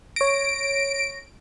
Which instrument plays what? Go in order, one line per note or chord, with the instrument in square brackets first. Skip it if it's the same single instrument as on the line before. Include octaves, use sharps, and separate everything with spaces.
[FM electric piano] C#5 A#6 [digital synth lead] D7